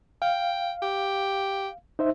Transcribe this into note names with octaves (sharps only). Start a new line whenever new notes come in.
F5 G5
G4
D#4 C5 E5